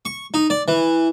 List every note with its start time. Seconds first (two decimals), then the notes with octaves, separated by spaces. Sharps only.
0.05 C#6
0.34 D#4
0.50 D5
0.68 E3